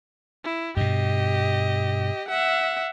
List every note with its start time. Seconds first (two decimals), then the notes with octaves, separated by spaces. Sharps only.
0.44 E4
0.77 G2 B2 G4 D#5
2.28 E5 F#5